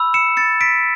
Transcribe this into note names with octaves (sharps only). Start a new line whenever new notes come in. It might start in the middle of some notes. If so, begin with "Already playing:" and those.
Already playing: B5 E6
C#7 E7
A6 C#7
B6 D7